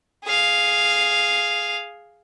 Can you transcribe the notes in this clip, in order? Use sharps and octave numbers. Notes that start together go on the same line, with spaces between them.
G#4 F5